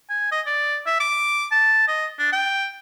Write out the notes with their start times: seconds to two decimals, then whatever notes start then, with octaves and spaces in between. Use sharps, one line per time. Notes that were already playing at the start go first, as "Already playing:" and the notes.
0.10 G#5
0.32 D#5
0.46 D5
0.86 E5
1.00 D6
1.51 A5
1.88 D#5
2.19 D4
2.32 G5